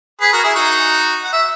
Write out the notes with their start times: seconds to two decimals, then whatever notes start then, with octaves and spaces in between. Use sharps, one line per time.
0.21 G#4 B4
0.33 F#4 A#4
0.44 E4 G#4
0.55 D#4 F#4
1.24 F#5
1.33 E5